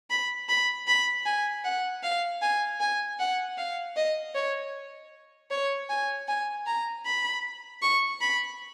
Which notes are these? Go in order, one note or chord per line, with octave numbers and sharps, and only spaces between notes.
B5
B5
B5
G#5
F#5
F5
G#5
G#5
F#5
F5
D#5
C#5
C#5
G#5
G#5
A#5
B5
C#6
B5